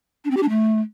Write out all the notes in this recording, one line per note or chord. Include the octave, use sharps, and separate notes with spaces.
D4
C4
G4
D4
A3